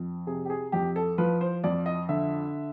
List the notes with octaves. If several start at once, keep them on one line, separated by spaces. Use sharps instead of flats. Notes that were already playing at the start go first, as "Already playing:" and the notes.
Already playing: F2
C3 G#4
G4
G#4
F2 G4
A4
F3 B4
C5
F2 D5
D#5
D3 E5